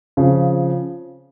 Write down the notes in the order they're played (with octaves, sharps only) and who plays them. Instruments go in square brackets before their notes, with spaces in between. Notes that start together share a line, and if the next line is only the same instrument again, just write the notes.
[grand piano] C#3 F3 C4